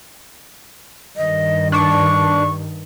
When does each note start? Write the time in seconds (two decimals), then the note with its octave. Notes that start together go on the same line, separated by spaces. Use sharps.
1.17 G2 D#3 D#5
1.72 D4 C#6